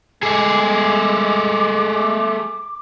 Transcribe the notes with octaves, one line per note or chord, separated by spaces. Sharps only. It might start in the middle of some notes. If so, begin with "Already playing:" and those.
G#3 A3 G#4 D6